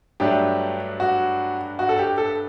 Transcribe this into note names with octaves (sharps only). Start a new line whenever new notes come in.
G2 F#3 A3 D4 G4
F#4
F#4
A4
G4
A4